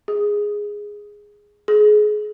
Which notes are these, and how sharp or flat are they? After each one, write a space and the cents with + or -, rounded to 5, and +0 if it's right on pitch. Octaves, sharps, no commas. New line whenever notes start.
G#4 -5
G#4 +25